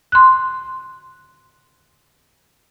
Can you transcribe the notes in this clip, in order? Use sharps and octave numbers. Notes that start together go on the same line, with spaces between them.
C6 F#6